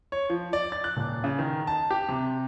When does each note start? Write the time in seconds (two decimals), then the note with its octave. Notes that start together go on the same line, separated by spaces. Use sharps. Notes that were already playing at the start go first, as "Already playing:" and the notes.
0.12 C#5
0.29 F3
0.53 D5
0.72 A6
0.84 F#6
0.97 D#1
1.24 C#3
1.39 D#3
1.67 A5
1.91 G4
2.08 C3